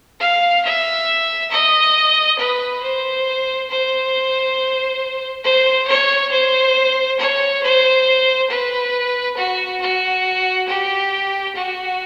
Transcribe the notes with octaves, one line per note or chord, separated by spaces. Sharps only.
F5
E5
D#5
B4
C5
C5
C5
C#5
C5
C#5
C5
B4
F#4
F#4
G4
F#4